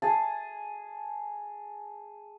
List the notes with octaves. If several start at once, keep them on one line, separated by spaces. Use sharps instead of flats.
G#4 G#5 A5